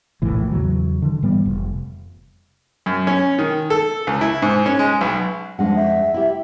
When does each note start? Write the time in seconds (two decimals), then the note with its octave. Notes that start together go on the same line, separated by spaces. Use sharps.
0.22 A#1 D#2 A2 E3
0.51 E2 C#3 E3 F#3
1.02 D3 E3
1.23 G#2 E3 G3 B3
1.46 F1
2.86 F#2
3.07 C#4
3.39 D#3
3.70 A4
4.07 C#2
4.21 E4
4.42 G#2
4.66 C#4
4.79 G#3
5.01 B1
5.59 F2 G#3 D4 F#5
5.76 E5
6.14 E4 G4